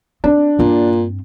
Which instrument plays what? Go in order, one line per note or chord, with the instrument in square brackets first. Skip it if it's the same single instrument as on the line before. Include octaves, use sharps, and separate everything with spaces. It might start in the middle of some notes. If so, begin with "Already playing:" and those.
[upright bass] C4 [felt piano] D4
[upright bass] G2 C4 [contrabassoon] A#2